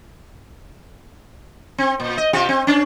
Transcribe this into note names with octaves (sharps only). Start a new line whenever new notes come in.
C4
A#2
D#5
C3 F4 G4
C4
C#4 D4